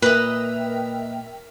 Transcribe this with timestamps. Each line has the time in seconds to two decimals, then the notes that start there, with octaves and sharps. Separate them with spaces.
0.02 A#2 A#4 B4 D#5 E5 G5